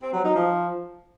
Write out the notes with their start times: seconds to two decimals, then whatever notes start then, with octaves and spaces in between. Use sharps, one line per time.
0.02 C4
0.13 F#3
0.24 D#4
0.36 F3